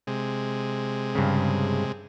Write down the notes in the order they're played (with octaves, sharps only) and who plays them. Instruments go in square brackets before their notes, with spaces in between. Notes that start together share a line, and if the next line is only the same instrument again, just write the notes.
[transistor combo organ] C3 G#3
[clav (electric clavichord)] G2 C#3